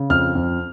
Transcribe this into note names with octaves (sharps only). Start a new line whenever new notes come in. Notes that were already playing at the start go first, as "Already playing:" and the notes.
Already playing: C#3
F2 F6
F2